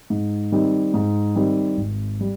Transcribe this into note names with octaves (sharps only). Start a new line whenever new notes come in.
G#2
D#3 G3 C4 D#4
G#2
D#3 G3 C4 D#4
G#1
G3